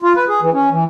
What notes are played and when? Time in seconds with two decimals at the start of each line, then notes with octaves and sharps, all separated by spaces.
0.02 F4
0.16 B4
0.28 G#4
0.42 E3
0.54 C#4
0.71 E3